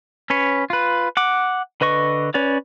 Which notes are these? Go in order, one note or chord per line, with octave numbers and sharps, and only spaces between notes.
C#4 B4 C#5
F4 B4
F#5 D6
D3 B4 D#5 C#6
C#4 B4 C#5 D5